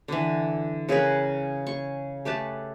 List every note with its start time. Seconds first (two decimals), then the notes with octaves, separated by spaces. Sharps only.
0.08 D3 E3
0.89 C#3 G#4 A#4 B4
1.67 C#6
2.25 A3 G4 B4 A5